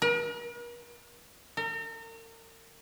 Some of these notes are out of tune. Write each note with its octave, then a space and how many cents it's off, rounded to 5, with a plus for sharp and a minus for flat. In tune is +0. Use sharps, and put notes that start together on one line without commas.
A#4 +45
A#4 -40